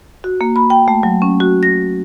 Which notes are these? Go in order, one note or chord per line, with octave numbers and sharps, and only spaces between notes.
F#4
A#3
B5
G5
A3
F#3
C#4
F#4
A#6